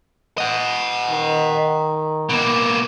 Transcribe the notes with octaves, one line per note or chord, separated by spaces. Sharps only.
D#5 F#5
D#3
B2 A#3